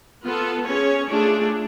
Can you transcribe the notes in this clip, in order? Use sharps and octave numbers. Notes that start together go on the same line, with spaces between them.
B3 F4 A4
C#4 G#4 C#5
A3 D4 F4 G#4